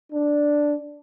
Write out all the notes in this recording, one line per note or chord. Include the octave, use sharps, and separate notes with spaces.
D4